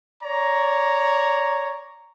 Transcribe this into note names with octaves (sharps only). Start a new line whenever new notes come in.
C#5 D5 A#5